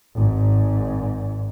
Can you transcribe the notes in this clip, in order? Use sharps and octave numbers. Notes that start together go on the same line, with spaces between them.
G#1 G#2